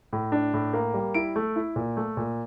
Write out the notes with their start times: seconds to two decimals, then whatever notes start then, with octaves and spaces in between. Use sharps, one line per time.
0.13 A2
0.32 D4
0.54 A2
0.74 A#3
0.94 G3
1.14 E4 D7
1.36 A3
1.56 E4
1.76 A#2
1.97 A3
2.17 A#2